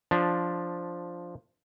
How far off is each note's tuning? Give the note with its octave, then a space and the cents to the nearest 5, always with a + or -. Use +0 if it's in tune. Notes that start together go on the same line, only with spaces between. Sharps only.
F3 +0 D4 +0